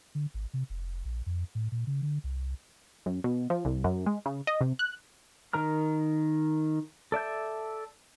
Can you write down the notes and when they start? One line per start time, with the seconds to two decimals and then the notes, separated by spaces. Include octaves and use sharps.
0.15 D3
0.34 G#1
0.54 C3
0.70 F1
1.05 A#1
1.26 F2
1.55 A2
1.72 A#2
1.87 C#3
2.02 D3
2.24 C2
3.06 F#2
3.24 B2
3.50 F3
3.65 C2
3.84 F#2
4.06 G#3
4.26 C#3
4.47 D#5
4.61 C3
4.79 F#6
5.53 D#3 A#4 A#5 F6
7.12 A4 D5 E5 G6